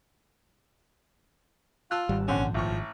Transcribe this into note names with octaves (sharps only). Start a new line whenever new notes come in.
F4 A5 E6 F#6
G#1 G3
A#1 D3 C4 C#4 F#4
A1 F3 C#6